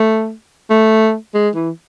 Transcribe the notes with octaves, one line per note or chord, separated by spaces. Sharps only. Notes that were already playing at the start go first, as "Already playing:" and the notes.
Already playing: A3
A3
G#3
E3